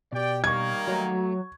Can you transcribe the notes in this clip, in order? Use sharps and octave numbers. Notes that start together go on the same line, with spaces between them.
B2 G4 D5 G5
D#3 G3 A#3 C#6 G#6
F#3 A3 A#5